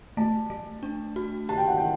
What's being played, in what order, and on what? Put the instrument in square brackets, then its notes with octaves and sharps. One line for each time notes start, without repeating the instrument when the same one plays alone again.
[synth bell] A3 [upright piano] A5
[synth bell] A3
D4
F#4
[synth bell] G4 [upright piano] A5
[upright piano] G5
F#5
G5